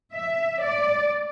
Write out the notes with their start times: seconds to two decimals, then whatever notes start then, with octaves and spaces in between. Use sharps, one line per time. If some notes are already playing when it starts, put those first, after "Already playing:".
0.14 E5
0.63 D5